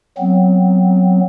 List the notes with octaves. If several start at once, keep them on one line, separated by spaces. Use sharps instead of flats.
F#3 B3 C4